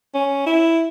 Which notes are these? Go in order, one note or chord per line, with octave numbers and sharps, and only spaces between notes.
C#4
E4